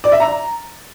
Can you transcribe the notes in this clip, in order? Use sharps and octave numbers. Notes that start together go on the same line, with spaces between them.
D5
E5
A#5